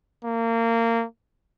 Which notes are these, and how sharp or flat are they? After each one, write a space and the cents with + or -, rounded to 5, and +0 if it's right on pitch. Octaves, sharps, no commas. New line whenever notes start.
A#3 -25